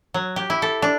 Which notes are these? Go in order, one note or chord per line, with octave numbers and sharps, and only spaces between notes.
F#3
G4
E4
A4
D4